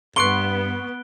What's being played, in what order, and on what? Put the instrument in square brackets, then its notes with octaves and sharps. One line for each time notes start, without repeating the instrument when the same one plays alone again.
[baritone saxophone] G2 [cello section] B3 [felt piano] C6 C#6 C7 [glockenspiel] F#6 D7 G7